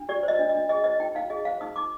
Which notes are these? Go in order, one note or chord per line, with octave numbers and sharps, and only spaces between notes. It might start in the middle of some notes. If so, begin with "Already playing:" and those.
Already playing: D4
G4 D5
C5
D#5
D4
D#5
D4
G#4 D#5
C5 D#5
D#4 G5
D#4 F5
G#4 D#5
C5 F5
D#4 D#6
D#4 D6